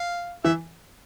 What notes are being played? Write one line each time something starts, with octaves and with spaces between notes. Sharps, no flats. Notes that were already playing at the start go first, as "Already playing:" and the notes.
Already playing: F5
E3 E5